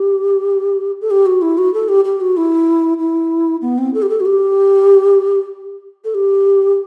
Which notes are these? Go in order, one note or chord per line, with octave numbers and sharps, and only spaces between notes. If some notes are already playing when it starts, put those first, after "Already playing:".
Already playing: G4
A4
G4
F#4
E4
F#4
A4
G4
G4
F#4
E4
E4
B3
C4
A4
G4
A4
F#4
G4
A4
G4